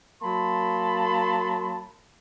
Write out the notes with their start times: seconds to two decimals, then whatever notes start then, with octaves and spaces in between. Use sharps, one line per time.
0.23 F#3 A#3 A5 B5 C6